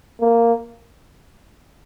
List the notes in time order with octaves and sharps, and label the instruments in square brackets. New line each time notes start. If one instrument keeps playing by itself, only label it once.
[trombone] A#3